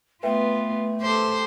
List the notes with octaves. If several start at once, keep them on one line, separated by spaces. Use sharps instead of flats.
A3 B3 F4 B4 E5 G5
G4 A4 C5